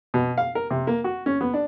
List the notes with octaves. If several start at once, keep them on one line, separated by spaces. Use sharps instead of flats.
B2
F5
A#4
C3
A#3
F#4
C#4
B3
D4